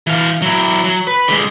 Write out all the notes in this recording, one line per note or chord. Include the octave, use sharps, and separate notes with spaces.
E3 F5
F#3 E4
F#3
B4
D3 G#3